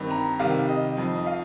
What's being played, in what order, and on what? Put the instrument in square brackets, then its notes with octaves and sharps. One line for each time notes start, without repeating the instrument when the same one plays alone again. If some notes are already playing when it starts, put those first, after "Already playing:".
Already playing: [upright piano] G2 D#3 C4
A#5
C3 D#3 G3 F5
D#5
F2 F3 D#4
D#5
F5